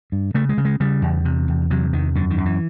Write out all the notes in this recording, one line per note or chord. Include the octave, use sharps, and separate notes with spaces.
G2
C#3 A3
G#3
C#3
G#3
C#3 G3
E2
C3
E2
C3 F#3
E2 D#3
F#2 D3
D#3
F#2
E3